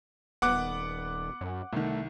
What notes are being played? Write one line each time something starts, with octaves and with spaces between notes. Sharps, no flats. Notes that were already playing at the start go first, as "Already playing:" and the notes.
D#1 B3 F#5 D6 F#6
F#2
C2 D#3 A3